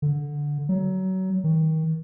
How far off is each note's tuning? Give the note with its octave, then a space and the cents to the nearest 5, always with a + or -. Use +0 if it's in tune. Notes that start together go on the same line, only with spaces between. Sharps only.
D3 -5
F#3 +25
D#3 +30